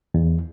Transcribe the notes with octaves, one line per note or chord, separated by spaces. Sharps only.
E2